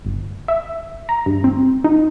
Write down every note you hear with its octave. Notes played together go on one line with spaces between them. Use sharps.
G1
E5
A#5
G2
C4
D#4